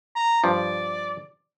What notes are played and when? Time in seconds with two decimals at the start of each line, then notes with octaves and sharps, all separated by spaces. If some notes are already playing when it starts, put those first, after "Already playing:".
0.15 A#5
0.44 G2 F3 D5